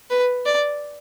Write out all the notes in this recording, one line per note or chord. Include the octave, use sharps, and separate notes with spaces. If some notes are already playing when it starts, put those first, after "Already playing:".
B4
D5